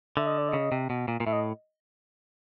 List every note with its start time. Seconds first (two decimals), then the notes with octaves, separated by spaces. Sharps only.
0.17 D3 E5
0.27 D#5
0.38 D5
0.49 C#3 D#5
0.72 C3
0.90 B2
1.08 A#2
1.20 A#2
1.26 A2 E5
1.33 D#5